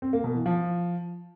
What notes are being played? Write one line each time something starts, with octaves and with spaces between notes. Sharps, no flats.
C4
A#3
B2
E3
F3